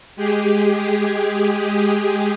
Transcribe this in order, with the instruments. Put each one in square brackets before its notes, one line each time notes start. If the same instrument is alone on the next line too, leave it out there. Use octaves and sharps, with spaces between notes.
[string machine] G#3 G4 G#4